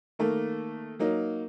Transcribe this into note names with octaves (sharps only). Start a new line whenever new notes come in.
D#3 A3 A#3
F#3 A#3 D#4